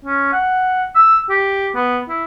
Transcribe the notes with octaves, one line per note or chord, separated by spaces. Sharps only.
C#4
F#5
E6
G4
B3
E4